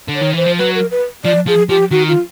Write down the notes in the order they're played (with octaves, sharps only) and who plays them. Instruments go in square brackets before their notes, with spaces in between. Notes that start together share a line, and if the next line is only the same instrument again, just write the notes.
[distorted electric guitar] D3
[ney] C#5
[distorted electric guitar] D#3
[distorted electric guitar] E3 [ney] C5
[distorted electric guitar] F3
[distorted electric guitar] F#3 [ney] B4
[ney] A#4
B4
[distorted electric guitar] F3 [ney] D5
[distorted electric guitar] F3 [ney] G#4
[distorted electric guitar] F3 [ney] G4
[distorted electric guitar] D#3 [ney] F#4
[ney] F4